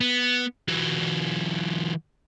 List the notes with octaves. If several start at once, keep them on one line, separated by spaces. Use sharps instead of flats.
B3
E3 F#3